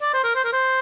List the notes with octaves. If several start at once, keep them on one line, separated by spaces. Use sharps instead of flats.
D5
C5
A#4
C5
A#4
C5